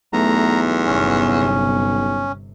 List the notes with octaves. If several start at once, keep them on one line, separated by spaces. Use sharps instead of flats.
B1 E2 A3 A#5
G1 C3 C#4